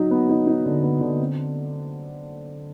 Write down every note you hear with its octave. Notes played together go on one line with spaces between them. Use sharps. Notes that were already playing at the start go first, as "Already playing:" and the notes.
Already playing: F#3 D#4
B3
D#4
D#4
D3
B3
D3
C4